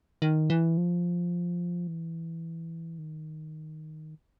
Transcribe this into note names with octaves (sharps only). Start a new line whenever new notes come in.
D#3
E3
F3
E3
D#3